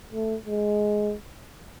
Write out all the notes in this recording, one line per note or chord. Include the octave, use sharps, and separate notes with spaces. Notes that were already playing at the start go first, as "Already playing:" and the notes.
A3
G#3